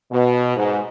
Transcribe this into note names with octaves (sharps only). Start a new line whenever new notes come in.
B2
G#2